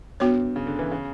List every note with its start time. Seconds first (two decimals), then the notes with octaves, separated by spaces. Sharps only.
0.20 G2 B3 F#4 C#5
0.56 C#3
0.67 D3
0.79 E3
0.92 C#3